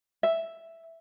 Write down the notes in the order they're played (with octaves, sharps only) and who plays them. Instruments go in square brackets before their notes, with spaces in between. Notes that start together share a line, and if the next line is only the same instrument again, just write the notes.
[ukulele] E5